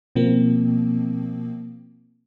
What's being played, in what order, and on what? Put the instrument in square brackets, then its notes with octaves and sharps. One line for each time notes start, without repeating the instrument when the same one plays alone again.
[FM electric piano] B2 F3 A#3 C4